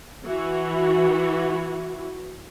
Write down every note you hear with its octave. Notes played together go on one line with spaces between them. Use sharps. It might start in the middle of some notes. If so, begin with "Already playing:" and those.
E3 F#4